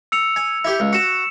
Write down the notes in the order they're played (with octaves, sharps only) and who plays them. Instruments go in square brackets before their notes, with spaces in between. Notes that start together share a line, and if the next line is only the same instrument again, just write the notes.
[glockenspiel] E6 C#7 F7
[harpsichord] G#5
E4 G4
C#2
[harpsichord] F#4 [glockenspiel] C#7 E7